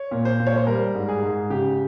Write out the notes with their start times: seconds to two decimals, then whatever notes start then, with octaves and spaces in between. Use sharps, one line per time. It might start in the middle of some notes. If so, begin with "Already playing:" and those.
Already playing: C#5
0.11 A#2
0.25 C5
0.40 A#2
0.47 C#5
0.57 C5
0.67 G3 A#4
0.95 G#2
1.08 G#4
1.22 G#2
1.50 C#3 G4